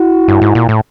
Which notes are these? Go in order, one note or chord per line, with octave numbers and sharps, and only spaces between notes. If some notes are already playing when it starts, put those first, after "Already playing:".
Already playing: E4 F#4
G2
G#2
A#2
A2